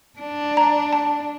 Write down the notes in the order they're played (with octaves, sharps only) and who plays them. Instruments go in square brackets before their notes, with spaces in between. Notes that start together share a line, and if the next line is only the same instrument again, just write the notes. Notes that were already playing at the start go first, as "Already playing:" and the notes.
[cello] D4
[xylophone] A#5
A5